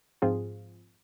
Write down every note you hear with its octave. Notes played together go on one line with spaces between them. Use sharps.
G#2 F3 C4 F4 G#4